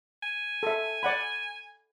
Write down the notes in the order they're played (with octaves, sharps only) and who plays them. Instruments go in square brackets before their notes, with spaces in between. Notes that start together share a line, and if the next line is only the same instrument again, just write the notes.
[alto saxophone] G#5
[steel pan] A4 E5
D5 F#5 B5